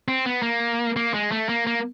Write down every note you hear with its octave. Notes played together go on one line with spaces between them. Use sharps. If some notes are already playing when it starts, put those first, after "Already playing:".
C4
B3
A#3
A#3
G#3
A3
A#3
A#3